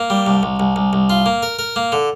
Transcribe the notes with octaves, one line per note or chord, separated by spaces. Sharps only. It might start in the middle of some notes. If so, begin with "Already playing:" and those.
Already playing: A#3
G3
C2
C2
C2
C2
C2
F4
A#3
A#4
A#4
A#3
D3